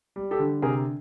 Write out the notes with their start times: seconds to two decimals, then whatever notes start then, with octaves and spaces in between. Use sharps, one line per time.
0.16 G3
0.31 G4 A4
0.39 D3
0.62 C3 G#4 A#4